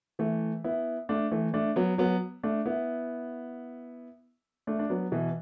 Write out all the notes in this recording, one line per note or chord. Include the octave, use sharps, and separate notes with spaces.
E3 A3
B3 E4
A3 D4
E3 A3
A3 D4
F#3 B3
F#3 B3
A3 D4
B3 E4
A3 D4
D4
F#3 B3
B2 E3